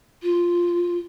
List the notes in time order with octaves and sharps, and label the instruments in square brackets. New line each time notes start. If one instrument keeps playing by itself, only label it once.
[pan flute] F4